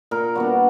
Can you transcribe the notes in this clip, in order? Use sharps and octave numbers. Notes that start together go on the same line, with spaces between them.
A#2 A#4
G3 B3 D4 F#4